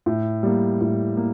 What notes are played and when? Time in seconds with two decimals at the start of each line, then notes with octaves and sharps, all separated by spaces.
0.06 A2
0.43 G3 A#3
0.81 A2
1.17 A#3